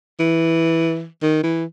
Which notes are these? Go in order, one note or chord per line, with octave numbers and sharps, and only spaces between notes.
E3
D#3
E3